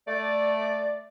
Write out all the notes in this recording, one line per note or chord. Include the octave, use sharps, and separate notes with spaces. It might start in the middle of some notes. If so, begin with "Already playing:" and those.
A3 D5